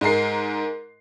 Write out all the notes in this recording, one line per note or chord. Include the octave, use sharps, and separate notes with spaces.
G#2 G#3 A#4 C7